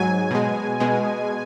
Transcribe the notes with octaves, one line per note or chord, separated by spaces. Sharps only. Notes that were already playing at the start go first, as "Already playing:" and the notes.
Already playing: G#2 F#3 G#5
B2 G#3
B2 G#3